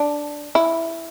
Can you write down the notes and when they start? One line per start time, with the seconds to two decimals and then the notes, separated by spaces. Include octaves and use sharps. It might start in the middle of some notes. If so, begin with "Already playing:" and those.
Already playing: D4
0.55 E4